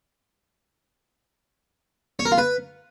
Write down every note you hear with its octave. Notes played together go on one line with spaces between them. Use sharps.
C#5
A#4
F4
B4